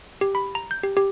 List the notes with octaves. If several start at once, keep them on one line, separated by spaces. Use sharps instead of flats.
G4
B5
A#5
G6
G4
G4